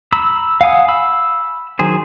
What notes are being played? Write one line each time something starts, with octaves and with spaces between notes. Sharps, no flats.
A#5 B5 E6
F5 F#5 G#5 D#6
B5 E6
D#3 F#3 G#4 C5